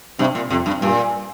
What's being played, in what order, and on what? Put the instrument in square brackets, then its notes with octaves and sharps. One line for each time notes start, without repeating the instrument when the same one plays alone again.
[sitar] G2 [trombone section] C3
[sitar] A#2
[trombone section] F2 [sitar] C3
[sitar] G2
[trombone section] G2 [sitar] A#2